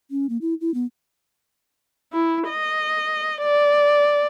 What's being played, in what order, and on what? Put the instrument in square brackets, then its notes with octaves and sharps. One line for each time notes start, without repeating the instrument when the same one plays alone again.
[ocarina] C#4
A#3
E4
E4
B3
[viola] E4
D#5
D5